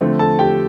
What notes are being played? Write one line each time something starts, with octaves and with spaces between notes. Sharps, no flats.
D3 F3 A3 C4
A4 A5
G4 G5